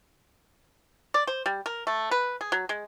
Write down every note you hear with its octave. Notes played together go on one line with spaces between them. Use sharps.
D5
C5
G3
A#4
A3
B4
G#4
F#3
G#3